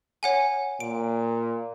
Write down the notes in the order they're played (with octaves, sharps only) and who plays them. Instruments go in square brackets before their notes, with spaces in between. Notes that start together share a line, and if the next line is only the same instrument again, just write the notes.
[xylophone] C#5 F#5 G#5
[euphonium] A#2 [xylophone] D7